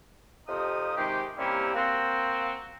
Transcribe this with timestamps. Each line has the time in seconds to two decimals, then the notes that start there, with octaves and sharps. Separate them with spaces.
0.48 F2 C3 F3 D#4 D#6
0.97 C3 D#3 G#3 G4
1.38 C3 G3 A#3 C4 C#4 E4
1.75 A#3 C4 F#4